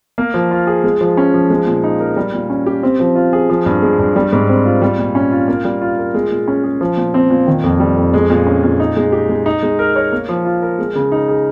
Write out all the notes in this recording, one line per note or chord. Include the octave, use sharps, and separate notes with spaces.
A#3
F3
F4
G#4
G#3
F3
C#4
F3
G#3
A#2
D#4
A#4
G3
A#2
C#4
G4
C4
F3
F4
G#4
F3
G2
G#3
G2
G3
G#2
C4
F4
G3
A#2
C#4
F4
A#3
G3
F4
A#4
G#3
A#2
C#4
G#4
F3
A#2
C4
A#2
D#3
F2
G3
F2
G#3
A#2
C#4
A#2
D#4
G#3
G4
G#3
D#4
G#3
A#4
C#5
A#3
F3
F4
A#4
G#3
C#3
D#4
G#4